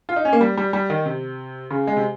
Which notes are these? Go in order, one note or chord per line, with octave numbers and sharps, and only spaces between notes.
F4
D#4
C#4
A#3
G3
G3
G3
D#3
C3
C#3
G#3
C3